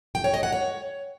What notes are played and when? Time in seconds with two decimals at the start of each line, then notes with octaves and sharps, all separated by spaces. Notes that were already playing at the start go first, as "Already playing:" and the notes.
0.15 G5
0.24 C#5
0.34 D#5
0.43 F#5
0.52 C#5